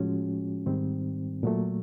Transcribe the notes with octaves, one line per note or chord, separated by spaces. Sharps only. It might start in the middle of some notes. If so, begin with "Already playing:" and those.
Already playing: A2 F3 G#3 C#4 F#4
G#2 D#3 G3 C4
A#2 F#3 A3